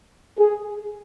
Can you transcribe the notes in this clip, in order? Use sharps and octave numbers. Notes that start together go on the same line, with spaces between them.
G#4